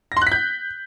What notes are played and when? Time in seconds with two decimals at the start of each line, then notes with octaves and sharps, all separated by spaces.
0.12 A#6
0.17 C6
0.22 F#6
0.27 B6
0.32 G6